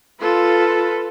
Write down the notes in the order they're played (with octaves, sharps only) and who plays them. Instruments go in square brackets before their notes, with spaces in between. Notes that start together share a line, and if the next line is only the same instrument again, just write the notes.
[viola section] F4 [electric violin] A4 B4